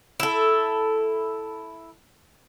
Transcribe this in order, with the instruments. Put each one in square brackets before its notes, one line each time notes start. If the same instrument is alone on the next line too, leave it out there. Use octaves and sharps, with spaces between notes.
[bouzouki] E4 A4